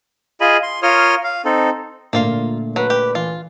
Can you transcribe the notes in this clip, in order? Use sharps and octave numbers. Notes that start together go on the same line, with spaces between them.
F4 G#4 D#5 G#5 B5
C6
F4 A#4 C#5 C6 D#6 F6
F5
C4 D#4 A4
A#2 D3 A3 A#3 F4 F5
F#3 B4
G4
E3 F4